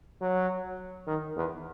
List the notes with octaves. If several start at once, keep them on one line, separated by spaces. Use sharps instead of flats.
F#3
D#3
E2